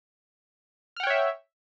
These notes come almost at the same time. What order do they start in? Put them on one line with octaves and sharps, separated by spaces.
F6 F#5 G5 C#5 E5